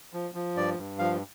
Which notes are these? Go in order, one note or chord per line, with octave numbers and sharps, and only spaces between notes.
F3
F3
G2 D5
G2
F3 F5